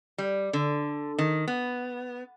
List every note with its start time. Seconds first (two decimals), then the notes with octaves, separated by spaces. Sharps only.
0.18 G3
0.53 D3
1.19 D#3
1.48 B3